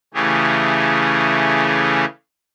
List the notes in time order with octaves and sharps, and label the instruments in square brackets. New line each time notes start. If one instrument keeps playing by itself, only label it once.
[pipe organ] C#3 E3 A3 C#4 G4 G#4